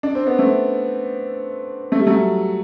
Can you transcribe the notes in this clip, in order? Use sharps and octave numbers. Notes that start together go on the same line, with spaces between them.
D4
C4
B3
A3 C4
A3
G3
F#3 A3